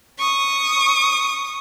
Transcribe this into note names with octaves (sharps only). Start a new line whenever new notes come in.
C#6 D#6